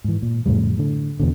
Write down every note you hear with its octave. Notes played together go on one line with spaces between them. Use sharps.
G#2 E3
A#2
F2 A2 C#3 G3
A2 D3
E2 B2 D3